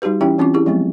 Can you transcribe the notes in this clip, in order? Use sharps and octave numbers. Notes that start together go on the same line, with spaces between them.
G3 D#4 F#4 G4 B4
E3 C#4 E4 G4 E5 G5
E3 C4 C#4 F4 D6
E4 G4 G#4
F3 F#3 G#3 B3 C4